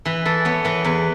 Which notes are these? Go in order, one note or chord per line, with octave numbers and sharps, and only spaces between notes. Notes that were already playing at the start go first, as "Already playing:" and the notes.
E3 B4
E3 A4
B3 C#5
E3 B4
E2 B4